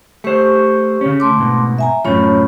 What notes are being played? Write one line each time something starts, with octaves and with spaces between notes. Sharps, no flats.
A3 G4 C5 C#6
C#3 C#4
A3 C6 D6
G#2 B2
E5 G#5 A#5
F#2 A2 F3 C#4 C#5 B5